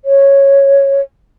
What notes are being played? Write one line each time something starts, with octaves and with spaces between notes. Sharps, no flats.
C#5